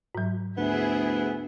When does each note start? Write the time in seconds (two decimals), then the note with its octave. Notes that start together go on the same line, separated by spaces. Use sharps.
0.15 G#2 F#3
0.58 D2 B3 E4 G#4 E5